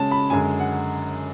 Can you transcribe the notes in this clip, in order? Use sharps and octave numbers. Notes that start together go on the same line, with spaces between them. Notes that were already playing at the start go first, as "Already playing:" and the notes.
Already playing: C#3 G#3 C#4 A5
B5
F#2 D3 G#3 G#5
F#5